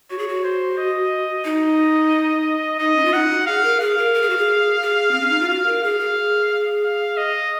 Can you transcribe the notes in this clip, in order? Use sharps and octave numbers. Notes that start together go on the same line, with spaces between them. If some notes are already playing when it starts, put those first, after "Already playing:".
F#4 C#5
G#4
F#4
C5
D#5
D#4 D#5
D#4 D#5
C#4
F4
D#4 F#5
F#4
G#4 F5
A#4
G#4 F5
A#4
A#4
G#4
F#4
G#4
G#4
C4
C#4
D#4
F4
F#4 F5
A#4
G#4 F5
G#4
F5
D#5